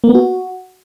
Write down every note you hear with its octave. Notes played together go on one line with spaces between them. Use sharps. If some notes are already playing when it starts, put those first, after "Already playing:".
A#3
B3
F#4